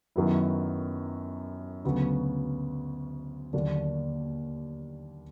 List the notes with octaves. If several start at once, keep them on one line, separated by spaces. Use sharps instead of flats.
F#2 D#3 F#3 B3 E4
D2 C#3 F#3 B3
D#2 D3 F#3 A#3 D4